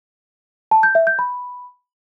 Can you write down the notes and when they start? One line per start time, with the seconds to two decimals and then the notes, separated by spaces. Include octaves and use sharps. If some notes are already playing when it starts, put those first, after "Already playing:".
0.71 A5
0.83 G6
0.95 E5
1.07 G6
1.19 B5